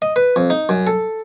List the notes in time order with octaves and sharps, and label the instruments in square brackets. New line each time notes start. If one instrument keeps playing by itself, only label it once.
[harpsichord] D#5
B4
F2
D#4
F#2
A4